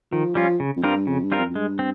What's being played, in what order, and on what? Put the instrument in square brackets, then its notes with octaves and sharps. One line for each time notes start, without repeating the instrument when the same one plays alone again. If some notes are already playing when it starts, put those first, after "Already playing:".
[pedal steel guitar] D#3 [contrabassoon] F3
[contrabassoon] F3 [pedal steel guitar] G3 C#4 F4
[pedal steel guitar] C#3
[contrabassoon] F2
[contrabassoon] G2 [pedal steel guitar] G3 C4 F4 A#4
[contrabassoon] F2 [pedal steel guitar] C#3
[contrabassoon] G2
[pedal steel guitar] G3 C4 F4 A#4
[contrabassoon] F2
F2
[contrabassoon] G2 [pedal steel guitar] G#3
[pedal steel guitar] C4